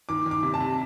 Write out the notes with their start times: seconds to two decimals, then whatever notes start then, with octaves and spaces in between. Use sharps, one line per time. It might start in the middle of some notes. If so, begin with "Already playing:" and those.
0.09 D#3 D6
0.26 D#3
0.31 D6
0.43 C3
0.54 A5
0.60 C3